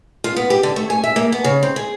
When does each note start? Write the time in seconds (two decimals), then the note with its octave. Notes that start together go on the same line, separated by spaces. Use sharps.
0.24 F4
0.36 B3
0.50 G4
0.63 D3
0.76 A3
0.90 G#5
1.04 E5
1.16 A#3
1.32 B3
1.44 C#3
1.63 C4
1.76 G#4